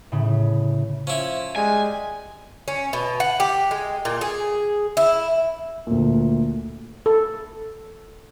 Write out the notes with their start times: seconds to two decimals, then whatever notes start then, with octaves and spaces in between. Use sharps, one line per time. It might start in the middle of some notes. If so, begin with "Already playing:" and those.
0.12 A2 C#3
1.07 F3 C#4 E4
1.56 G3 G#3 G#5
2.68 C#4
2.93 B2
3.20 F#5
3.40 G4
3.71 G#3
4.05 A#2
4.21 G#4
4.97 E4
5.87 D2 A#2
7.06 A4